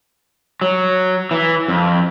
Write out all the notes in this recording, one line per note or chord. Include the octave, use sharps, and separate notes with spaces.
F#3
E3
F2